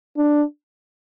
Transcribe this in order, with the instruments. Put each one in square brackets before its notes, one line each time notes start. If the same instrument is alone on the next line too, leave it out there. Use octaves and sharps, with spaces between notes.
[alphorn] D4